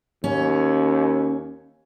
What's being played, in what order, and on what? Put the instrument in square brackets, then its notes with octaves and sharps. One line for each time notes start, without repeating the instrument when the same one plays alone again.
[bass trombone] D#2 [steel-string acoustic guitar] C#4